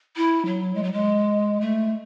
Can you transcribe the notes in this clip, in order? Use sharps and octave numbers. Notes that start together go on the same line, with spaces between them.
E4
F#3
G#3
F#3
G#3
A3